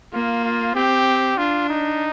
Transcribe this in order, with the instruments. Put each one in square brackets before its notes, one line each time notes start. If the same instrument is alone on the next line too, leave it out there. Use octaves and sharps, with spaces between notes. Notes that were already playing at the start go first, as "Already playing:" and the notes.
[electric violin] A#3 [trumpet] F4
[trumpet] F4
[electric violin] C4 [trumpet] G4
[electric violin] D4 [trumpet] F4
[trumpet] D#4